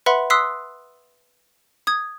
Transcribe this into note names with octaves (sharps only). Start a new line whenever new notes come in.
B4 E5 F#5 B5 C6
C6 D#6 E6 F#6 B6 C7
D#6 G#6